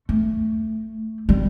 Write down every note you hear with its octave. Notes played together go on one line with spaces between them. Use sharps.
A3
G3